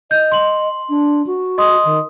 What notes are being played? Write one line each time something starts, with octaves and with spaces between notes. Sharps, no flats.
D#5 G6
C6 F#7
D4
F#4
D#5 C6 D#6
D#3